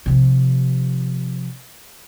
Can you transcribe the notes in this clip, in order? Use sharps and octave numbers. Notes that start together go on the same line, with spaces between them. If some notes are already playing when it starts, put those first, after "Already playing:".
C3 F3